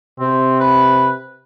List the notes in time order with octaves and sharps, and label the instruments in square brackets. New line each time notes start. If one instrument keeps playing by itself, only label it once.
[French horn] C3 [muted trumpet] C4
[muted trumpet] B4